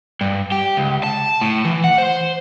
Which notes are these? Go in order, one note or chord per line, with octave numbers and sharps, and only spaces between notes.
G2
G4
C#2
A5
A2
E3
F#5
C5